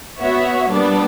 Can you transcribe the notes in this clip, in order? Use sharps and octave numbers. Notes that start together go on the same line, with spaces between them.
B3 F#4 C#5 E5
A#2 G3 B3 D4